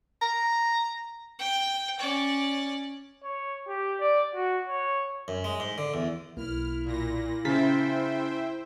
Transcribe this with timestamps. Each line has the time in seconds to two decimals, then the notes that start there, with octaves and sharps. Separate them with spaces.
0.21 A#5
1.39 G5
1.98 C#4 D5
3.23 C#5
3.67 G4
4.00 D5
4.35 F#4
4.69 C#5
5.28 F#2
5.44 G#3
5.60 G#2
5.78 D3
5.94 E2
6.37 B1 A#3 E4 F6
6.85 A#2 A#6
7.45 C#3 C5 E5 G5 A#5 A6 B6